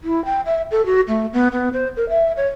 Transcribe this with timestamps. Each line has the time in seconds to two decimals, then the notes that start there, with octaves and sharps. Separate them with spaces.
0.04 E4
0.25 G5
0.46 E5
0.71 A4
0.86 F#4
1.08 A3
1.33 B3
1.52 B3
1.73 C5
1.96 A#4
2.09 E5
2.37 C#5